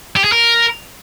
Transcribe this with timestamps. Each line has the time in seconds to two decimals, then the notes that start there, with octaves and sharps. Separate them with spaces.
0.16 G4
0.24 G#4
0.32 A#4